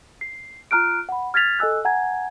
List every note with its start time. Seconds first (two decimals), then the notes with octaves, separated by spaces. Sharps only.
0.21 C7
0.71 F4 A#5 F6 F#6 D7
1.09 F#5 B5
1.34 F6 G#6 A6 B6 F7
1.59 A4 D#5 G#5 E6 F#6
1.85 F#5 G#5 A#5 G#6